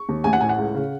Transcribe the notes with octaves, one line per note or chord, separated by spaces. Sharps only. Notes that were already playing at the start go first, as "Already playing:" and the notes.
Already playing: C#6
D#2
A1 G#5
F#5
A2 G#5
F#5
C#2
C#3